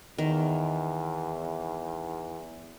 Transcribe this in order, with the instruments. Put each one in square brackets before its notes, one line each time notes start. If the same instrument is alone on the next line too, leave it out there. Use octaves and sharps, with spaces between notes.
[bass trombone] E2 [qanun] D#3